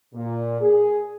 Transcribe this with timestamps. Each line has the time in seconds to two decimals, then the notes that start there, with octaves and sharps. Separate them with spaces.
0.14 A#2
0.61 G#4